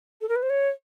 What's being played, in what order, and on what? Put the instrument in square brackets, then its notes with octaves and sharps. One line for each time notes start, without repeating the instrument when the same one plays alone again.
[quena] A4
A#4
B4
C5
C#5